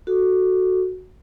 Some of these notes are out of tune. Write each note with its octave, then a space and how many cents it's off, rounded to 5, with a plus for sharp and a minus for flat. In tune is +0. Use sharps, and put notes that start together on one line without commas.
F#4 +0 A4 +0